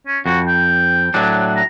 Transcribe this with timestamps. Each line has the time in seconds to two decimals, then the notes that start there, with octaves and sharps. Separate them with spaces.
0.07 C#4
0.26 F2 F#4
0.47 G5
1.14 A2 F#3 D4
1.56 A#5